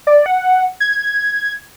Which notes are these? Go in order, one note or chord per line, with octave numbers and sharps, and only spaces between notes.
D5
F#5
G#6